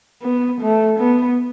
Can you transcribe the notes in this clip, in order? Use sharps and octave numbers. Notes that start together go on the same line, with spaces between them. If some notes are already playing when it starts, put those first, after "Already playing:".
B3
A3
B3